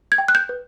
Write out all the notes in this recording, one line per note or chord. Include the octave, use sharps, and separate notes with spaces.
G#6
G5
F#6
G6
B4